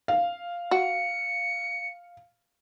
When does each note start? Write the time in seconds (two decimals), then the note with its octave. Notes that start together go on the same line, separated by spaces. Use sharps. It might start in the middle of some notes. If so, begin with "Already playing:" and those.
0.08 F5
0.71 F#4 C#7